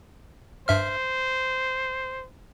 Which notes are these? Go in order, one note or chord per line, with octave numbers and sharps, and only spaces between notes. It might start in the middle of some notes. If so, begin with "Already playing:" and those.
G2 C5 E5 F6